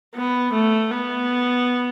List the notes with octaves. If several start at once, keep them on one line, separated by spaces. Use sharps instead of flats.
B3
A3
B3